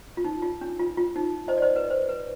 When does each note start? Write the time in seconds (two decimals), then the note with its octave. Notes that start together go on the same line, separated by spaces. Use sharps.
0.17 F4
0.24 D#4
0.42 F4
0.61 D4
0.79 F4
0.98 F4
1.16 D#4
1.48 C5 D#5
1.58 D5
1.62 C5 D#5
1.76 B4
1.90 C5
2.09 B4